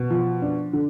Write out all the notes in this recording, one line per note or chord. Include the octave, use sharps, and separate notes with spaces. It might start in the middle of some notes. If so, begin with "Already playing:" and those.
Already playing: B2
F3
D4
D3